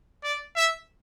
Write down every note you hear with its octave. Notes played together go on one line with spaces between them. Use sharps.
D5
E5